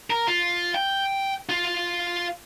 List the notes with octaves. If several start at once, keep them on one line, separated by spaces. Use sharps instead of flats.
A#4
F4
G5
F4